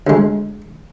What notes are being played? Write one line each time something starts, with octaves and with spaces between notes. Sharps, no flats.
D2 G#3